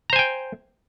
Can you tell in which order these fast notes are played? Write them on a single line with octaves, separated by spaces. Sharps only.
A#5 C5 G#5 G5